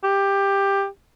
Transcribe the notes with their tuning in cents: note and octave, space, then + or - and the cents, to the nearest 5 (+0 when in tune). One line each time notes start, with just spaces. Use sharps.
G4 +10